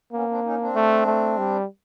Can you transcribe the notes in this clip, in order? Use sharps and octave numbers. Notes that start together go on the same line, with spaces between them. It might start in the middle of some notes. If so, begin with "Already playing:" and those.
A#3 B3 C#4
C4 D4
C#4 D#4
C4 D4
A3
A3
G3